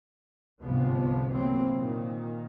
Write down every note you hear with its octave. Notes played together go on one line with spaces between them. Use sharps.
G1 C2 G#2 C3 F3 B3
C3 E3 F#3 A#3 C4
A#2 D#3